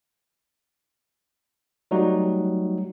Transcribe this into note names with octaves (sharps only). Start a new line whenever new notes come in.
F#3 G3 A3 D#4 F#4